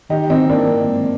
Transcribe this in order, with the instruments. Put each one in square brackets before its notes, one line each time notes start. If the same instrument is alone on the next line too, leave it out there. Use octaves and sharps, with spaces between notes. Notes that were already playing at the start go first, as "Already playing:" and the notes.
[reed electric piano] D#3 [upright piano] D#4 G4
[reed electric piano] D#3 [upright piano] C4 D#4
[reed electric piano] G2 [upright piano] A#3 D4
[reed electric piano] C4
G#3